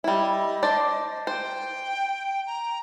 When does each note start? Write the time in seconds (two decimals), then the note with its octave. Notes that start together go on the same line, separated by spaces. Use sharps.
0.04 G3 E4 D#5
0.63 D4 C5 D5
1.27 C5 G5
2.47 A#5